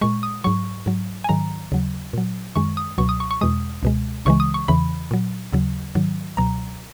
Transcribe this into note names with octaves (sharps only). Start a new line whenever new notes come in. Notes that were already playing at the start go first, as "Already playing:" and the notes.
A#2 G#3 C#6
D#6
G#2 F#3 C#6
G#2 F#3
G#5
G#2 D#3 F#3 A#5
D#2 C#3 F#3
A#2 F#3
F#2 D#3 G#3 C#6
D#6
C#2 B2 F#3 C#6
D#6
C#6
C#6
E2 B2 G#3 D#6
C#2 B2 G#3
C#2 C#3 E3 G#3 C#6
D#6
C#6
E2 C#3 E3 B5
A#2 F#3
D#2 C#3 F#3
G#2 D#3 F#3
C#2 B2 F#3 A#5